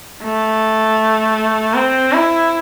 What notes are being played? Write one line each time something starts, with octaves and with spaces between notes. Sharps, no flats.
A3
C4
E4